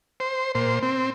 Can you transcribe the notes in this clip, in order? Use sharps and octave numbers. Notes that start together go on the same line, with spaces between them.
C5
A#2 C5
C4